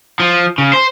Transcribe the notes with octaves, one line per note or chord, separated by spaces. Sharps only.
F3
C#3
C5